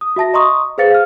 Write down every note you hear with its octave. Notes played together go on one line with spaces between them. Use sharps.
D#6
F#4 E5 A5 A#6
D#5 A#5 C6 C#6 D#6
G#4 B4 C5 F5 A6 C#7
F5 F6